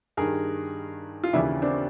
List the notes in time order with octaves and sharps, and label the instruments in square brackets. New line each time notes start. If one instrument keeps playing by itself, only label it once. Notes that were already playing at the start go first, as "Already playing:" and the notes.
[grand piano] G2 D#3 G#4 A#4
F4
D#2 C#3 E3 D4 E4
C4 D4